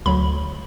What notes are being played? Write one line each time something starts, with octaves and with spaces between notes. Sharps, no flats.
D2 D3 F#3 B5